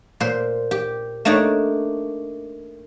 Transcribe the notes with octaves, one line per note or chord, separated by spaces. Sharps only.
A#2 C5
G4
A3 A#3 D4 D#4 C#5